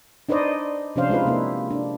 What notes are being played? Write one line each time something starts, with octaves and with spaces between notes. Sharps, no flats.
D4 D#4 B4 C5 D5 D#5
C3 F3 C#4 D4 C5 F5
G#3 D#4 F4 B4
C3 A#3 E4
D4